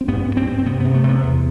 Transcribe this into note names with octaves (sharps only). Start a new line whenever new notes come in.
C4
G2 B3
G2
C4
G2
C4
C3 B3
B3
C3
A3
C3
B3
E2